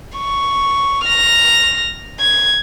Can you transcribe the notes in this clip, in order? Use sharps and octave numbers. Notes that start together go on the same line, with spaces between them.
C#6
F6 A#6
G#6